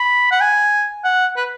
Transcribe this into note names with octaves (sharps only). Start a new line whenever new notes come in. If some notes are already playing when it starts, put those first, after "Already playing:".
Already playing: B5
F#5
G#5
F#5
B4